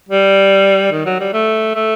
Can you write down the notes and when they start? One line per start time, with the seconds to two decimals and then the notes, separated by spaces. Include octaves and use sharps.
0.09 G3
0.92 D#3
1.06 F#3
1.20 G3
1.33 A3
1.75 A3